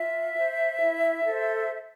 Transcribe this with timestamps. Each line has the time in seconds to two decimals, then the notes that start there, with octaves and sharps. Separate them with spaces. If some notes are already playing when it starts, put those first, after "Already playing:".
Already playing: F4 E5
0.37 C5
0.81 E4
1.25 A4 C5